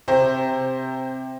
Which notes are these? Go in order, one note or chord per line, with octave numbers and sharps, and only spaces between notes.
C3 C5